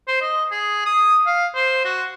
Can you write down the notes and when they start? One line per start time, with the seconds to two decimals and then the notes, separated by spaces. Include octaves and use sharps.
0.08 C5
0.22 D#5
0.51 G#4
0.86 D#6
1.27 F5
1.55 C5
1.85 F#4